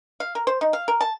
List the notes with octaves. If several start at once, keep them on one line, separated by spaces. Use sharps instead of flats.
F5
A#4
C5
D#4
F5
A#4
A5